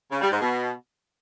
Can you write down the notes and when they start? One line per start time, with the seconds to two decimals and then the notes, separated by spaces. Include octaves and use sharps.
0.12 C#3
0.21 G3
0.31 G#2
0.41 B2